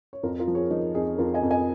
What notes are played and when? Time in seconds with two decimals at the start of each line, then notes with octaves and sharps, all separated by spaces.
0.13 C#5
0.23 F2 F4 A#4
0.39 F4 A#4
0.47 F3
0.55 G#4 C#5
0.70 F3 D#4
0.94 F2 D#4 G#4
1.18 F2 F4 A#4
1.34 D#5 G#5
1.43 F2
1.50 D#5 G#5